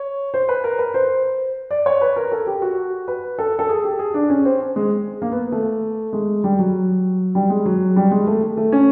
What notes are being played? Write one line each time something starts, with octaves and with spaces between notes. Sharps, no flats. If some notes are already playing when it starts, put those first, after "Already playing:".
Already playing: C#5
C5
B4
A#4
B4
C5
D5
C#5
B4
A#4
A4
G4
F#4
B4
A4
A4
G#4
G4
G#4
D4
C#4
C4
G#3
A#3
B3
A3
G#3
G3
F#3
G3
G#3
F#3
G3
G#3
A3
A3
C#4